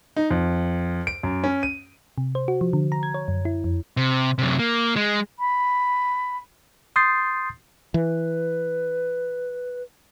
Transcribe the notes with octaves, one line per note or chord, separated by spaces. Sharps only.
D#4
F2
D7
F#2
C#4
D#7
C3
C5
F#4
F3
D3
A#5
G#6
C#5
F#2
E4
F2
C3
F#2 C3
A#3
G#3
B5
C6 D#6 G6 A6 C7
E3 B4